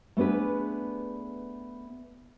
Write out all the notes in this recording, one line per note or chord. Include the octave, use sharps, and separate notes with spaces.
A3 B3 D4 G#4 B4